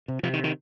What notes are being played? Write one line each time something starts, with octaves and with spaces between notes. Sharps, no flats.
C3
C3 F3
D#3
D#3